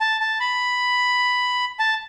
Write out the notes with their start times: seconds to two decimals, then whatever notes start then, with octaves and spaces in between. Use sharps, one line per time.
0.01 A5
0.21 A5
0.40 B5
1.79 A5